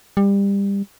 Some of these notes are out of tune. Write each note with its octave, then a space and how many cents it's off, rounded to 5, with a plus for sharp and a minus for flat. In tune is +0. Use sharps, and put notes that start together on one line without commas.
G3 +25